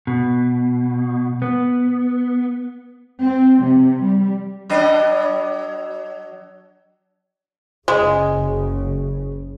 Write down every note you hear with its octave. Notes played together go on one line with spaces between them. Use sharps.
B2
B3
C4
C3
G3
F#3 D4 D#5
F#1 C#3 G#3